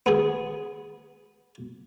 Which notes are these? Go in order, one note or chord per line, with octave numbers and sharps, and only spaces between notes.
B3 G#4